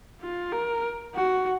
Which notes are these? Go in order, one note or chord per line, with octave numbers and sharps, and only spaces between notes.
F4
A#4
F#4